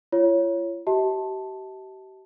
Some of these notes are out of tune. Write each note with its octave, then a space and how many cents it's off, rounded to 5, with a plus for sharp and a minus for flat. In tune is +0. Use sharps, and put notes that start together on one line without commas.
F4 -45 C#5 +0
G4 -35 E5 -45 A5 +0